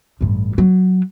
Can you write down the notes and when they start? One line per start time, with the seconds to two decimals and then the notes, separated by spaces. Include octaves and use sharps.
0.21 A1 G2
0.58 F#3